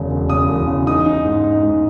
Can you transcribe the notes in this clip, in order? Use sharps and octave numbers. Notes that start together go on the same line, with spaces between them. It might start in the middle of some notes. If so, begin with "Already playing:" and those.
Already playing: E1 C#3
E1
C#3 D#6
E1
C#3
D#4 D#6
D#4
G#2
D#4
G#2